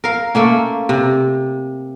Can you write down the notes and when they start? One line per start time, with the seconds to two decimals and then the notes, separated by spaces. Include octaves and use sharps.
0.04 A#4 F5
0.35 A3 A#3 C#4
0.89 C3